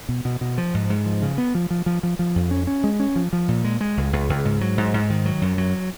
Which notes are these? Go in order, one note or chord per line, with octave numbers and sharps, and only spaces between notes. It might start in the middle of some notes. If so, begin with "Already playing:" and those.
B2
B2
B2
F3
G#2
G#2
F3
C#3
B3
F3
F3
F3
F3
F3
F2
C#4
C#4
G#3
C#4
F3
F3
A#2
G#3
G#3
C#2
C#2
C#2
G#2
F#3
G#2
G#2
D#3
F#3
F#2
F#3